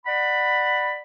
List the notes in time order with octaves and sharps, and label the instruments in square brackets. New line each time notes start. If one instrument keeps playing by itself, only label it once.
[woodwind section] D5 F#5 B5